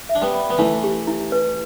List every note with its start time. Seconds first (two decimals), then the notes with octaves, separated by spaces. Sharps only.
0.09 E5
0.15 D4
0.22 G3 B3
0.34 B5
0.50 B3
0.58 E3 A3 E4
0.84 G4
1.07 E4
1.32 B4